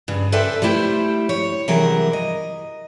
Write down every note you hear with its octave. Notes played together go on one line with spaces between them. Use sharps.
G2 C#3
A4 B4 C5 D5 E5 G5
G3 A3 E4 C5 G5
C#5
C3 E3 F#3 G3 G#4 A#4
D#5